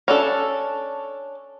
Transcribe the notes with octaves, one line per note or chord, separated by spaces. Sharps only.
C#4 D4 A4